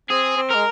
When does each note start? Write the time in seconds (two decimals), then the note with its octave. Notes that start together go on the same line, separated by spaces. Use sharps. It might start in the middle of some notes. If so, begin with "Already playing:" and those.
0.10 C4 G#4
0.37 C4
0.50 G#3 A#4